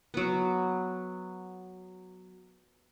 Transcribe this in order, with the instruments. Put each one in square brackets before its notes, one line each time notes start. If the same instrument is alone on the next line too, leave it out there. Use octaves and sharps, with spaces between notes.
[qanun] F#3 B3